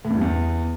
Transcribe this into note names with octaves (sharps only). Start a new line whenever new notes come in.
A2
E2
G2
E2